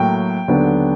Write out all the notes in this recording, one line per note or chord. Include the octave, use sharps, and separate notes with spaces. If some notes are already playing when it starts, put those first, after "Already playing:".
Already playing: A2 F#3 A#3 G5
D#2 D3 F#3 B3 D4